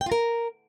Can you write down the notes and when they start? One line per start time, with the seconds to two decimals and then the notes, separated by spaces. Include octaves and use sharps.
0.01 G5
0.06 F4
0.12 A#4